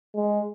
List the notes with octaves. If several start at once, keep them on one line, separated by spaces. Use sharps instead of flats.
G#3